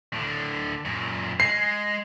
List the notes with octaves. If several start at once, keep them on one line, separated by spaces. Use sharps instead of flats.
A2 D3
F#2 A#2
G#3 C7